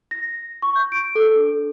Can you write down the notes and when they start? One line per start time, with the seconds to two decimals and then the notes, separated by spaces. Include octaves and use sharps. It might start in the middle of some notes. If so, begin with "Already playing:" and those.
0.11 A#6
0.62 C#6
0.75 G6
0.92 D7
1.15 A4
1.36 D4